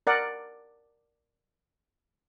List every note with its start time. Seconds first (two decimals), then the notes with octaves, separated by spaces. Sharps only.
0.07 A#4 D5 F#5